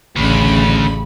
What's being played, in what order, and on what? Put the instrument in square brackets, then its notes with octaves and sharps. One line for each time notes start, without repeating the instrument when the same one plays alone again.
[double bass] A1 [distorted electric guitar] D2 [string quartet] C#3 B5